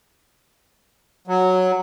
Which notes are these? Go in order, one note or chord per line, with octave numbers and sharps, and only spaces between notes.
F#3